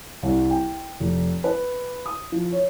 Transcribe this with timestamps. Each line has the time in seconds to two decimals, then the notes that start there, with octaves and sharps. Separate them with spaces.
0.23 C2
0.51 G5
1.00 F1
1.44 B4
2.06 D#6
2.32 F3
2.52 C#5